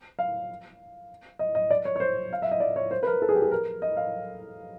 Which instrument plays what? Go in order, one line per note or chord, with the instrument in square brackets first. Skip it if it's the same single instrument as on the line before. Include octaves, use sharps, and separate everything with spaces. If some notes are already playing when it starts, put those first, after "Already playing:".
[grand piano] F5
D#5
D#5
D5
C#5
C#5
C5
F5
E5
D#5
D5
C#5
C5
B4
A#4
A4
G#4
G4
G#4
A#4
D#5
F5